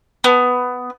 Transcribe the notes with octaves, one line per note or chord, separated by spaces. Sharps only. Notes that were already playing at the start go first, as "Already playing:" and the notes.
B3